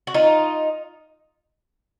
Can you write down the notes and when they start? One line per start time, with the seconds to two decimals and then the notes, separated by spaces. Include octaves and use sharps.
0.07 F#4
0.14 D#4 F4